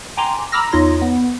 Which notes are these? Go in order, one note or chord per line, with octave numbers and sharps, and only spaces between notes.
G5 G#5 A#5 C6 D6
A#5 B5 D6 E6 F6 A#6
E2 D#4 F4 C#5 C6 A#6
B3